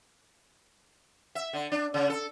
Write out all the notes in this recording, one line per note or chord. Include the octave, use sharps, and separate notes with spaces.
E5
D3
D4
C#3
A4